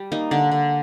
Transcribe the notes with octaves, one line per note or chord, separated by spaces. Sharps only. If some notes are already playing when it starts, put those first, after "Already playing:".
Already playing: G3
A#3 D#4
D3 D4
D3